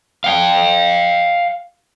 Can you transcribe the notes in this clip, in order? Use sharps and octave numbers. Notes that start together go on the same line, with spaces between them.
F5 G5